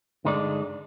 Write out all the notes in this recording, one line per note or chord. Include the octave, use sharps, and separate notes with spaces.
G2 D3 G#3 D#4 G#4 D5